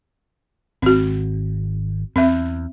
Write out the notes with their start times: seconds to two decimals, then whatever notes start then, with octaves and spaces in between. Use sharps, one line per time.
0.82 G#1 C4 F#4
2.16 E2 C4 E5